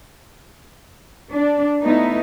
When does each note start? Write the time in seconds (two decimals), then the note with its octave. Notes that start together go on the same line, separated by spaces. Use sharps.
1.32 D4
1.83 A3 B3 D#4 E4